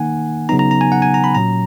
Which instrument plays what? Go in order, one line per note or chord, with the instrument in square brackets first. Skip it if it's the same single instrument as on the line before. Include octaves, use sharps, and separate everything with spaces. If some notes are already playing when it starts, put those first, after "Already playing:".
Already playing: [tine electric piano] D#3 A#3 D#4 F#5 G#5
C#3 F#3 B3 D#4 A#5
A#5
A#5
G#5
F#5
G#5
A#5
B5
A#2 F#3 C#4 A#5